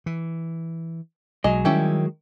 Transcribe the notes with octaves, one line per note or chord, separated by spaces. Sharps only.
E3
B1 F#3 G#3 D#5 G#5
D#3 G3 C#4 E4 G4